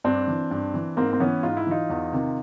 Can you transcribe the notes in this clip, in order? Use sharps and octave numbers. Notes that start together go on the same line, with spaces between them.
G2 C4 D4
E3
G2
E3
G#2 A#3 C4
C4
E3 B3 C#4
G#2 F4
E4
E3 D#4 F4
E2
C3 D#3